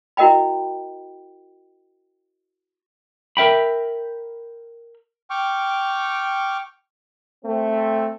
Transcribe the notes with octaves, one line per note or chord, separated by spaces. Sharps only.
E4 F#4 A#4 D#5 G5 B5
A#4 E5 G5 B5
G5 C#6 D6 F6
A3 C4